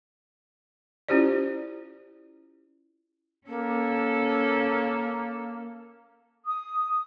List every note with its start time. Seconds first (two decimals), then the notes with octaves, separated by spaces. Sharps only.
1.08 C#4 E4 F4 G4 C5 D5
3.47 A#3 C#4 A4
6.46 D#6